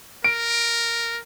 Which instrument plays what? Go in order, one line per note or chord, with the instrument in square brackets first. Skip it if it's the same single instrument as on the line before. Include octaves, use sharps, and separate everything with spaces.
[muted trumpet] A#4 [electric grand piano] D7